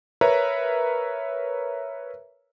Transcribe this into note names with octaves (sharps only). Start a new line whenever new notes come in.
A#4 B4 C#5 E5 A#5